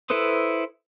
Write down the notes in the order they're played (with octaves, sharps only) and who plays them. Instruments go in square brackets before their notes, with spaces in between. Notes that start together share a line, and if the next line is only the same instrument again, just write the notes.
[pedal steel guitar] E4 A4 B4 C5 D#6